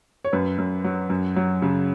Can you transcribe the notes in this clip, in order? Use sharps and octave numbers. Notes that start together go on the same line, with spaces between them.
C#5
F#2 B4
F#2
F#3
F#2
F#3
C#3